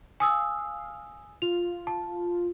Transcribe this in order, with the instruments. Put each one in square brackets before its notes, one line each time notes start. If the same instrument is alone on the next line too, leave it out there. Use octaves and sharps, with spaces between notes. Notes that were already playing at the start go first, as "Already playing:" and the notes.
[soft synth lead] F5 [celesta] G#5 D#6 E6
[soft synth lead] F4 [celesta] F7
[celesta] A5